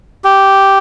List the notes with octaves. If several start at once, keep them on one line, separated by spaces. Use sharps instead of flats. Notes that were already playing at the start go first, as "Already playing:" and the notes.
G4